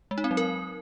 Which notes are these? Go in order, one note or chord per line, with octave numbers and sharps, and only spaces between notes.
G#3
D#4
C4
F#3
A#4